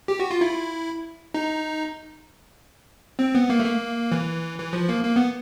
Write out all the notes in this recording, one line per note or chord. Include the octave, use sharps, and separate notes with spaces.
G4
F#4
F4
E4
D#4
C4
B3
A#3
A3
A#3
E3
E3
F3
A#3
A#3
B3